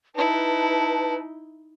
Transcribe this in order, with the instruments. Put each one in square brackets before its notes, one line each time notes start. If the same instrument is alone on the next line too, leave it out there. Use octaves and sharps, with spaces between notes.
[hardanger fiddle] D#4 E4 [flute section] B4 A5